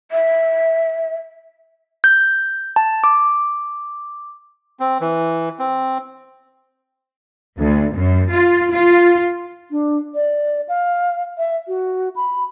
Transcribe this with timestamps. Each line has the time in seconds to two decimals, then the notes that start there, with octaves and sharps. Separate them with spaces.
0.11 E5
2.04 G6
2.76 A5
3.04 D6
4.80 C4
5.01 E3
5.59 C4
7.58 D2
7.94 F#2
8.31 F4
8.72 F4
9.71 D4
10.15 D5
10.69 F5
11.38 E5
11.68 F#4
12.16 B5